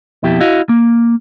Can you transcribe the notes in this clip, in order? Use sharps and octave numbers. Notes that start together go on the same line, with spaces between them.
F2 B2 E4 G4
E4 F#4 D#5 F5
A#3